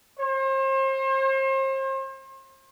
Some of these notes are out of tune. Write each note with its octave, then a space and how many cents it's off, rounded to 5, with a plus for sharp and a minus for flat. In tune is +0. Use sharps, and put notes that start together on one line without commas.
C5 +40